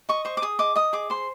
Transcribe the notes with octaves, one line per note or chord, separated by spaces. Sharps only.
D#5 C#6
C5 C#6
D6
G#4 D#6
D#5 D6
D#5 D#6
G#4 D6
C5 C6